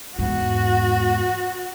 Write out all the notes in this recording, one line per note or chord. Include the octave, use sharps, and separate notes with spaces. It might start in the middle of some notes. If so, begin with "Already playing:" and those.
E2 G#2 F#4